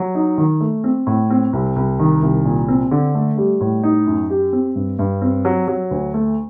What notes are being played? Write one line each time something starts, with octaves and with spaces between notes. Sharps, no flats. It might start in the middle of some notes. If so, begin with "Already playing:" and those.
Already playing: F#3
D#4
D#3
A3
C4
A2
C4
C2
C2
D#3
C2
A#2
C4
D3
A3
G3
A2
D#4
F#2
G4
C4
G2
G2
C4
F#3
F#3
D2
A3